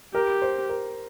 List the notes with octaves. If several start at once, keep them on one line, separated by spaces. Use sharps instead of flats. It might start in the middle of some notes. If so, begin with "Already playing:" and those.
G4 A#4
C5
A#4